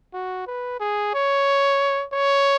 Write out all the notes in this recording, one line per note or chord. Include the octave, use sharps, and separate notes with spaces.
F#4
B4
G#4
C#5
C#5